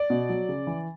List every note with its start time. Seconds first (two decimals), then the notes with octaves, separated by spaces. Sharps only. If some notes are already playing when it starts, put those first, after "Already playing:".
Already playing: D5
0.10 B2
0.29 F#3
0.49 C#3
0.67 E3